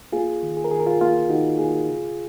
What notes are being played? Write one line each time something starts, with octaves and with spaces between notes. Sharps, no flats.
A#3 F4 G#4
D#3
G#4
A#4
D#3 G#4
A#4
F4 G#4
A#3 F4
D#3 D#4 F#4
A#3 F4 G#4
C#3